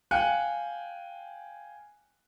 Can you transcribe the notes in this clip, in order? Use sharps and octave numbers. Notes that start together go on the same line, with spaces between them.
F5 G5 G#5 F#6 C#7